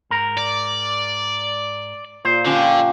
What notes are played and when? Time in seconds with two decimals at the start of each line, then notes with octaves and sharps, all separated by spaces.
0.10 G#2 A#4
0.37 D5
2.25 A#2 C5
2.45 D3 F3 C#4 G4